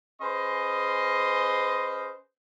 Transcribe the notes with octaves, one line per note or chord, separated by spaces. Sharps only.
C#4 G#4 B4 C5 D#5 C6